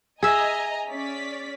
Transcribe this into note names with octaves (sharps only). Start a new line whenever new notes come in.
G#4 D#5 E5 G#5 A#5
C#4 D5 B6